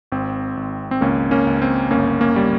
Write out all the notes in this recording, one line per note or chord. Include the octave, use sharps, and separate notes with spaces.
G#1 C4
G#1
C4
C#2 A#3 C#4
A#3 C#4
C#2
C4
G1 A#3 C#4
A#3 C#4
G3